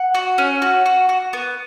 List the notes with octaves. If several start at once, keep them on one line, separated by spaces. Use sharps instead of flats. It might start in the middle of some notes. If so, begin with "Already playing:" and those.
Already playing: F#5
F#4
C#4
F#4
F#4
F#4
B3